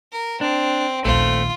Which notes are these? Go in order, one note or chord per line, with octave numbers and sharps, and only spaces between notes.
A#4
C4 D4
A#1 D#2 A3 C4 F4